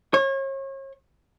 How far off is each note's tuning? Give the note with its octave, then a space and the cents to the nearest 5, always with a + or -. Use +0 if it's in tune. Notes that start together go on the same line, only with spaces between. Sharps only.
C#5 -35